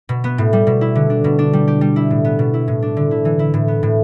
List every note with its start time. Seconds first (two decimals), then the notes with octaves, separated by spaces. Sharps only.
0.09 B2
0.24 B3
0.38 A2
0.53 G3
0.67 B2
0.81 E4
0.95 D3
1.10 D4
1.24 B2
1.39 D4
1.53 G3
1.68 G4
1.81 G3
1.96 E4
2.10 A2
2.24 B3
2.39 B2
2.54 E4
2.68 A2
2.82 D4
2.97 D3
3.11 E4
3.25 E3
3.39 E4
3.54 A2
3.68 B3
3.83 A2